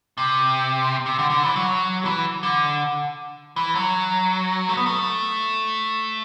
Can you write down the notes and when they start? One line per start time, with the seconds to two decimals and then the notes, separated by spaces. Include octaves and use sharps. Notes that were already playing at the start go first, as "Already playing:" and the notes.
0.18 C3
1.06 C3
1.19 D3
1.30 D3
1.43 E3
1.56 F#3
2.05 E3
2.43 D3
3.56 E3
3.75 F#3
4.69 A3
4.77 B3
4.86 A3